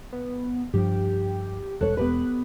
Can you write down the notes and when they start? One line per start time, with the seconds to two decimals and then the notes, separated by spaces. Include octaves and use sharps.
0.12 B3
0.74 G2 F3 G4
1.81 E1 A4 C#5 F#6
1.97 B3 G4 B4